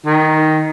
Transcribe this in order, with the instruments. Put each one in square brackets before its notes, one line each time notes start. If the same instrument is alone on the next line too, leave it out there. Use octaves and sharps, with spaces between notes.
[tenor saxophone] D#3